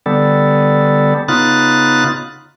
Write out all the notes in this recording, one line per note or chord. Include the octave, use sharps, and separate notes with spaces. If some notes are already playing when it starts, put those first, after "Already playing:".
D3 G3 B3 A4
C#3 B3 D#4 F4 F#6 A6